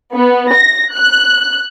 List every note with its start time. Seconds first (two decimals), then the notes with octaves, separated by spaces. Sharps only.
0.15 B3
0.53 A#6
0.95 F#6